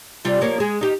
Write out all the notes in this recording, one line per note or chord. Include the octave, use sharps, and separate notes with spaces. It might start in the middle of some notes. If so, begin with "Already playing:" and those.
C3 G3 F4
F3 A#3 C#5
G#3 G#4
D#4 G4